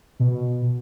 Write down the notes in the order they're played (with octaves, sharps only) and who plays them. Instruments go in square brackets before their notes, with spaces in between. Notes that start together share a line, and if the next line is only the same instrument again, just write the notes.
[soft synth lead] B2